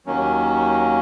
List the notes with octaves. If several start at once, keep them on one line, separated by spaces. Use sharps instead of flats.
D#2 D#3 F#3 A#3 C#4